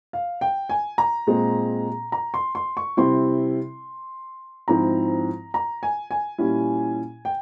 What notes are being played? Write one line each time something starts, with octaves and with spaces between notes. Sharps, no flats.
F5
G5
G#5
A#5
A#2 G#3 C4
A#5
C6
C6
C#6
C3 G3 C4 E4 C6
G#2 F3 C4 E4 A#5
A#5
G#5
G#5
A#2 G3 C#4 E4
G5